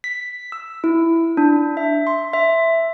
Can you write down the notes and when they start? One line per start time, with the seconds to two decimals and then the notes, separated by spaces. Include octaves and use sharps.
0.04 B6
0.52 E6
0.84 E4
1.37 D4
1.77 E5
2.07 C6
2.33 E5